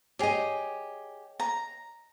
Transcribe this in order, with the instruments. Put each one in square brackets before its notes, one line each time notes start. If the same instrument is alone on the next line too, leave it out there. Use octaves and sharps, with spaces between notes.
[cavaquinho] G4 G#4 [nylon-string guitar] C#5 D#5
[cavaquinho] A#5